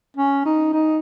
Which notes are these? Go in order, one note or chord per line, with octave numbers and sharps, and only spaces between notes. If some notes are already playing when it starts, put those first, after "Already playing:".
C#4
D#4
D#4